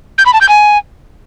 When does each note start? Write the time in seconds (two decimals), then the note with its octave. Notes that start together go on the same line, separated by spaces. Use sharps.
0.18 G6
0.26 B5
0.33 A5
0.41 G6
0.49 G#5